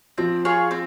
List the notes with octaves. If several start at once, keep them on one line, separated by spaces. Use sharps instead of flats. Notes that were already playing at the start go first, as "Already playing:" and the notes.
F3 C4
F4 G#4 C#5
C4